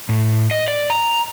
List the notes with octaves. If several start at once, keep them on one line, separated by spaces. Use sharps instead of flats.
A2
D#5
D5
A#5